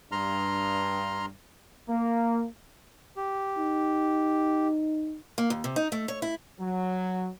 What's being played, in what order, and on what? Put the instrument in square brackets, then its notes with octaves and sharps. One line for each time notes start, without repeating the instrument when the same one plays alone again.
[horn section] G2 [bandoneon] A#5 C6 F6
[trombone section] A#3
[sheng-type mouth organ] G4
[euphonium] D#4
[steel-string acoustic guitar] A#3
D#2
C3
D#4
A3
C#5
E4
[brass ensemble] F#3